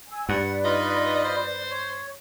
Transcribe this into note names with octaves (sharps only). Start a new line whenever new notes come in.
G#5 E6
G2 B4 D5 F#5
D#4 F4 D#5 B5
C5
C#5